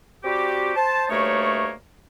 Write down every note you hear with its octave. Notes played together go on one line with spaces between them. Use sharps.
G3 C4 F#4 G4
C5 A5
D2 G2 A3 A#3 D#4 C#5